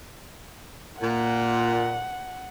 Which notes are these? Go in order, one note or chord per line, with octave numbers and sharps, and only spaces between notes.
A#2 F#5